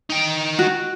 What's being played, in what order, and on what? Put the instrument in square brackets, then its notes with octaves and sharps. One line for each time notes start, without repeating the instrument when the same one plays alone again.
[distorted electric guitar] D#4 G5
[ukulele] F#4